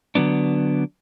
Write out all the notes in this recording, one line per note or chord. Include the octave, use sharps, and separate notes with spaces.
D3 F#3 B3 D4